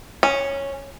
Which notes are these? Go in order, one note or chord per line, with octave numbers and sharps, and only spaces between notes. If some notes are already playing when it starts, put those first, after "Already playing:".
C#4